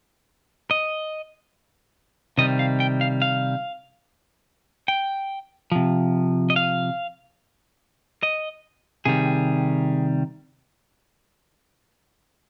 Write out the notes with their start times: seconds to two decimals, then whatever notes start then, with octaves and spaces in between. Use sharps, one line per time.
0.71 D#5
2.38 C3 D#3 G3 D#5
2.59 F5
2.80 G5
3.01 F5
3.22 F5
4.88 G5
5.72 C3 F3
6.50 D#5
6.56 F5
8.23 D#5
9.05 C3 D#3 G3 G#4